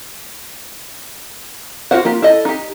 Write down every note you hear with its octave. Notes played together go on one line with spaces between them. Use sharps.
F4 F#4 A#4 C5 F#5
A#3 F4 G4
E4 A4 D#5
D#4 G4